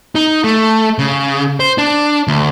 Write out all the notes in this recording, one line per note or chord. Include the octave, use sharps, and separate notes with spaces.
D#4
A3
C#3
C5
D4
D2